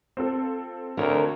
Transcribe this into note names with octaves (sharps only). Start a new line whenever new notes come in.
C4 F4 A4
D2 A#4 C#5 A#5